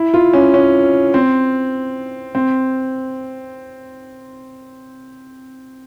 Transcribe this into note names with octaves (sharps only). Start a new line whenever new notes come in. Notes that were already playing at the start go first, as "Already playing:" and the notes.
Already playing: E4
F4
C#4
C#4
C4
C4